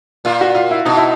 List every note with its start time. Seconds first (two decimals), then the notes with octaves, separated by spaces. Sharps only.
0.25 A#2 F4
0.41 F#4
0.55 F4
0.71 E4
0.85 B2 D#4
0.97 E4